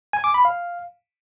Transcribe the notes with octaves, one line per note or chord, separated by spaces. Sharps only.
G#5
D6
B5
F5